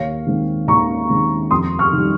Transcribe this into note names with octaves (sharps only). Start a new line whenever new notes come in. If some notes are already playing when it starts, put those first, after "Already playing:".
Already playing: D#2 C#5 F5
D#3 G#3 C4
D#2 A#5 C#6
D#3 G#3 C4
F2 C6 D#6
C#6 F6
D#3 G3